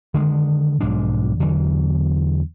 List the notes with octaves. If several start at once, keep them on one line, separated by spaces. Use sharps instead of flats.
D3 D#3 G#3
B1 G#2 F3 D4
E2 D3 E3 F#3